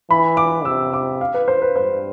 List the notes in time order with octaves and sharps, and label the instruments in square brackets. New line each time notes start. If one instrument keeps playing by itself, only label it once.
[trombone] E3 [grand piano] B5
[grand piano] D6
[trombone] C3 [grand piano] E6
[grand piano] D6
F5
B4
C5
B4
[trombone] G2 [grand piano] C5